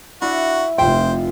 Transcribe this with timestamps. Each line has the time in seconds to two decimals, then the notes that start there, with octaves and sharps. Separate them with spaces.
0.22 D4 E4 F#4
0.78 F1 F4 C5 E5 G5